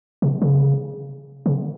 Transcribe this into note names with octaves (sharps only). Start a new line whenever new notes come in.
C3
C#3
C#3